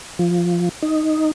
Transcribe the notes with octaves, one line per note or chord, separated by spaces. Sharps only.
F3
D#4